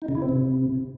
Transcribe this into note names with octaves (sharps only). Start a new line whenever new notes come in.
D#4
C#3
E4
C4
C3